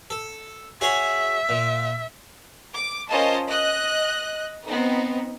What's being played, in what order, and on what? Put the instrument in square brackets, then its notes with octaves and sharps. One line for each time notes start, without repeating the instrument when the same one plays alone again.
[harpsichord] A4
[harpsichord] F#4 G#4 C#5 [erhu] E5
[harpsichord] A#2
[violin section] D6
C#4 F4 A#4 C5 D#5 A5
D#5 F#6
B3 C4 D#4